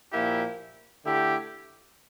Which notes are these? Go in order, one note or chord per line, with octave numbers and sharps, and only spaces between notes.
A#2 F3 A#3 E4 G4
D3 A3 E4 G4